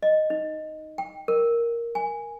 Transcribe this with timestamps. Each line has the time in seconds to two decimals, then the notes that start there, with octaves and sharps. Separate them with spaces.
0.03 D#5
0.30 D#4
0.98 G5
1.28 A#4
1.95 G#5